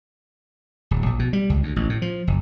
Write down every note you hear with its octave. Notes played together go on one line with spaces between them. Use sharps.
D1
A#1
B2
G3
C#2
D2
A1
A2
F3
F#1